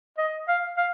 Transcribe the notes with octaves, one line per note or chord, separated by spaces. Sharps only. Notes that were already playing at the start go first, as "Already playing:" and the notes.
D#5
F5
F5